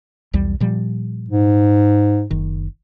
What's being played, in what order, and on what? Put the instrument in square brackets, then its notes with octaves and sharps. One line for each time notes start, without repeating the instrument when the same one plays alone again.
[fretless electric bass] B1 E2 G3
A#2 F3 G3
[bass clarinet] G#2
[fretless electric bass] F#1 D#3